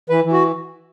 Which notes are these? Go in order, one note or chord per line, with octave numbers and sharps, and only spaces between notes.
E3 B4
E3
F#4